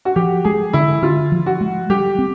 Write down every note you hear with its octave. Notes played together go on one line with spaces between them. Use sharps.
F#4
F3 G4
G#3 G#4
D3 E4
D3 F4
F3
F#4
G#3
G3 G4
C4